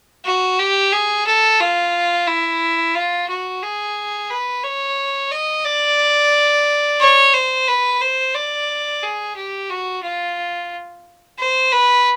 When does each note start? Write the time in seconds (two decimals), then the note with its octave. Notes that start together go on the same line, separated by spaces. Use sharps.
0.25 F#4
0.59 G4
0.92 G#4
1.27 A4
1.60 F4
2.27 E4
2.95 F4
3.29 F#4
3.63 G#4
4.30 B4
4.64 C#5
5.31 D#5
5.65 D5
7.00 C#5
7.34 C5
7.67 B4
8.01 C5
8.35 D5
9.03 G#4
9.36 G4
9.70 F#4
10.03 F4
11.39 C5
11.72 B4